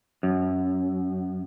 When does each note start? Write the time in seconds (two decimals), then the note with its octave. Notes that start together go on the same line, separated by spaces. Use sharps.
0.23 F#2